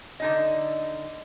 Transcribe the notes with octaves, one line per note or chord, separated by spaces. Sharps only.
D3 D#4 D#5